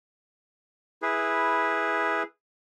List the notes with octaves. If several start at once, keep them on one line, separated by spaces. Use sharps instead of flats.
E4 G#4 B4